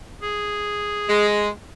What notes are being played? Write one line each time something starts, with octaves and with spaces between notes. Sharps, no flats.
G#4
G#3